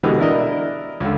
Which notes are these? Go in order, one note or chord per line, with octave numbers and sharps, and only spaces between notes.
B2 D3 E3 G3 G#3 B3
D4 E4 A#4 D#5
C#2 D3